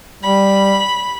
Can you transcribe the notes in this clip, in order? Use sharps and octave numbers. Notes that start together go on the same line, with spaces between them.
G3 B5